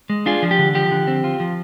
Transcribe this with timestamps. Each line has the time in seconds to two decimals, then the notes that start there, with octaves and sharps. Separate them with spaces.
0.10 G#3
0.26 D4 F4 G#4
0.43 F3
0.51 G4
0.59 D3
0.75 F3 G4
0.92 D3
1.07 C4
1.24 F4
1.40 F3